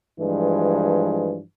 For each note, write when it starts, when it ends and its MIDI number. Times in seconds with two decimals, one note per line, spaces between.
0.20 1.40 43
0.20 1.40 52
0.20 1.40 53
0.20 1.40 56